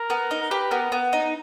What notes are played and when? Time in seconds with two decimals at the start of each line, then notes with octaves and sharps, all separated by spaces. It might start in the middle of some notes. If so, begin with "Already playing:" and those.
Already playing: A#4
0.10 B3
0.31 D#4
0.42 A#4
0.51 G4 B4
0.71 B3 A#4
0.92 B3
1.13 D#4